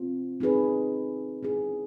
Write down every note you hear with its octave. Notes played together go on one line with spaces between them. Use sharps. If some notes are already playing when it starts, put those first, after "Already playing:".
Already playing: C4 F4
C4 D#4 G#4 B4
C#4 E4 G#4